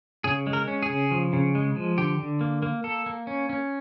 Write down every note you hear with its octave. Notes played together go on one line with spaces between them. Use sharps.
C#3 G#4
G#3
A#4
C#4
G#4
C#3
F3
C#3
G#3
F3
D3 G4
D3
A#3
A#3
A#3 A4
A#3
C#4
C#4